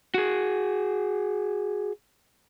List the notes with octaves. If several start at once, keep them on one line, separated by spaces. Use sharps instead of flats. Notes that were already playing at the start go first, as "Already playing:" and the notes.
F#4 G#4